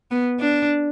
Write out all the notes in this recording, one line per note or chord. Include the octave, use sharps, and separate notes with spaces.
B3
D4